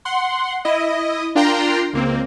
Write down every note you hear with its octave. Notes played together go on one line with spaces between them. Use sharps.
F#5 C6
E4 D#5
D4 F4 A#4 G5 A#5 C6
C#2 A#3 C4